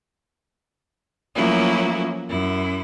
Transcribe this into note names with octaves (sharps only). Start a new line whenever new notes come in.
F3 F#3 A3 A#3 C#4 E4
F#2 E4